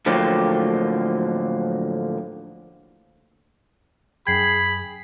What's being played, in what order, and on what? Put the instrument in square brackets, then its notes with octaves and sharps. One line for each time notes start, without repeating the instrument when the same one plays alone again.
[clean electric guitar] A2 D3 F3 F#3 A#3 G4
[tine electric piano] F#2 G5 [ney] G#4 [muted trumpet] B5 [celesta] G#6 C7